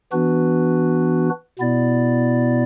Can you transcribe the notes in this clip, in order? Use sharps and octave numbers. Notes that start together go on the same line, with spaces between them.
E3 B3 D4 F#4 B4
B2 B3 E4 D5